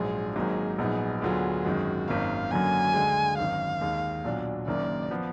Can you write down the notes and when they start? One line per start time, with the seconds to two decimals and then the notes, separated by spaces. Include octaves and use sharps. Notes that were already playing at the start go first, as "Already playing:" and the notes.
Already playing: A#1 G#2 F#3 D4 F4 G#4
0.36 G#1 G#2 F#3 A#3 D#4 G#4
0.78 A#1 A#2 F#3 B3 D#4 G#4
1.22 D2 D3 F#3 B3 F4 G#4
1.65 G#1 F#2 D#3 G#3 F#4
2.08 G#1 F#2 D#3 A#3 F5
2.51 F#2 D3 F#3 A#3 G#5
2.94 D2 D3 G#3
3.38 G#1 F#2 D#3 F5
3.81 D#2 D#3 G#3
4.24 B1 A#2 F#3 D4
4.67 F#1 F#2 D#3 A#3 D4 D5
5.11 F3 B3